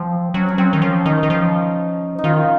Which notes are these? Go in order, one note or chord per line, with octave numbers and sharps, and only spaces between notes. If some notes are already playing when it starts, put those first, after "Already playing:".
Already playing: F3 C4
F#3 C#4
C#4
F#3 C4
D#3
F3 C#4
D#3 D#4
D#3
F3
D#4
D#3 F4